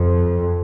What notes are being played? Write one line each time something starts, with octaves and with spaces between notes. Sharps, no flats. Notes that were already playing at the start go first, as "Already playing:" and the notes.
Already playing: F2